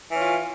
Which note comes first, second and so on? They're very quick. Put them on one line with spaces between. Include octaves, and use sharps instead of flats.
E3 C#4 F4